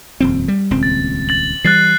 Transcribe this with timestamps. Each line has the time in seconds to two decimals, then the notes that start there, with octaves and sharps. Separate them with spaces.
0.20 D#1 F2 C4
0.48 G3
0.71 D#1 C#2 C4
0.83 A6
1.29 A6 F#7
1.65 E3 G3 F#6 A6 C7